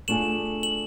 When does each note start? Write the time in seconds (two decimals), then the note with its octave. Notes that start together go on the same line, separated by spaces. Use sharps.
0.08 A3 D4 F4 G#4 E7 F#7
0.63 F#7